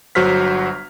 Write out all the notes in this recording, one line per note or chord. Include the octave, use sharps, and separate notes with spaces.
G1 F#3 F#4 C5 F6 B6